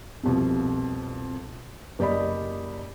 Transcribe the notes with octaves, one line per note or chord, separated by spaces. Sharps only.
C2 F2 B2
F#1 G4 D5 D#5 B5